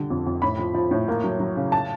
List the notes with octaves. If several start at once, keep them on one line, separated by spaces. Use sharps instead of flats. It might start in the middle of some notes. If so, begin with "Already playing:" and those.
Already playing: D3 G3
F2
F2
A2 B5
F3
F3
A2
A#3
F#3
F#3
C#3
A5